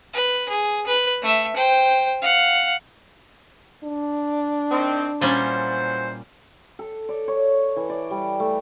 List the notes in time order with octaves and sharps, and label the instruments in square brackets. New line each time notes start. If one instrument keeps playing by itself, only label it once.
[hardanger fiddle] B4
G#4
B4
A3 E5
C5 G5
F5 F#5
[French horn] D4
[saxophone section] D#3 C4
[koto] A#2 G3 C#4 [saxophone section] E3 F#3 C5
[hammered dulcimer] A4
D5
C#5
E3
D5
G3
A3